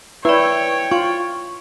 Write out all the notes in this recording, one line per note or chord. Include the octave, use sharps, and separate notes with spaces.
E4 B4 C#5 D5 G5
F4 C#6